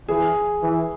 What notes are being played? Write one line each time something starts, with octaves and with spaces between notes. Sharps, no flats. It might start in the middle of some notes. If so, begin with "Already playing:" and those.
E3 G#4
E3